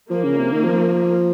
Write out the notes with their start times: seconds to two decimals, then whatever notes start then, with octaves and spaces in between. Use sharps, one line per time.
0.10 F3 A#3
0.24 C#3
0.38 C3
0.51 D#3
0.64 F3